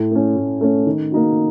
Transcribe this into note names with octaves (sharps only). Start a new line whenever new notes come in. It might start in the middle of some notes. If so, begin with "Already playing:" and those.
Already playing: A2
A3 C#4
A2
A3 C#4
D#3
A#3 D#4 F#4